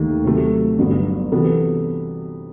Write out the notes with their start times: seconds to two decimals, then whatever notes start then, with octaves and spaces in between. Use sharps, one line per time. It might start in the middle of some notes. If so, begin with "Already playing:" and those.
Already playing: D#2 D#3 A3
0.25 C3 F#3 A3
0.78 G1 G2 F#3 B3
1.32 C3 E3 B3 F#4 A4